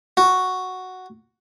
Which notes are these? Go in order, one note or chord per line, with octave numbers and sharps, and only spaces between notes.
F#4